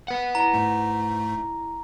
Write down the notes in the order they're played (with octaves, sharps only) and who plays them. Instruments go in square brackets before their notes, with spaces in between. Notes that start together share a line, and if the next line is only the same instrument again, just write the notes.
[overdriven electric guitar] B4 F#5
[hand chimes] E4 D5 A#6 [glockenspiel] A#5
[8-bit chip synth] G#2 A3